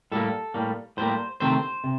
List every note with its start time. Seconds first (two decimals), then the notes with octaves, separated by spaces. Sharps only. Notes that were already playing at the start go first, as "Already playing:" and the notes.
0.12 A2 G3 A#3 A4
0.54 A2 G3 A#3
0.97 A2 G3 A#3 C5
1.40 C3 D#3 A3 C4 C5
1.84 C3